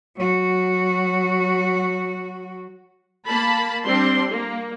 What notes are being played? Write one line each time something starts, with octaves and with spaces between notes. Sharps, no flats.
F#3 F#4
A#3 A5 B5
G3 C4 D4 C6
A#3